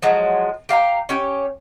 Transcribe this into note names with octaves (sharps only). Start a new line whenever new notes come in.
F3 F#3 G#3
G4 F5 G5 A#5
C#4 G4 C#5